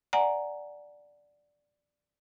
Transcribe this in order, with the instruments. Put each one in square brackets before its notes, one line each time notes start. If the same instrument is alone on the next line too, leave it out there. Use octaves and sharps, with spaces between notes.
[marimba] D5 F#5 G#5 A#5